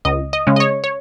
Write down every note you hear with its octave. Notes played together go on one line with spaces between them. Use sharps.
C#2 D#5
D#5
C#3 G#3 C#4
D#5
C#5
C#5